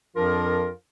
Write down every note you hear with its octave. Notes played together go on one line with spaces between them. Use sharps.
F2 F3 D4 F4 A#4